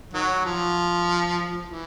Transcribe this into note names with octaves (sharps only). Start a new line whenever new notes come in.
D#3 F#3
F3
E3